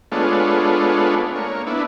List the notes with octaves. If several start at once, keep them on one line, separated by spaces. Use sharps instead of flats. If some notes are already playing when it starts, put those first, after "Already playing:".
G#3 A3 B3 D4 F4 C#5
A#3 C#5
B3 D4 E4